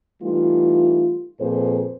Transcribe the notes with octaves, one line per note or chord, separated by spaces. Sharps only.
E3 G3 A3 D#4 F4
F2 A#2 G#4 B4 C5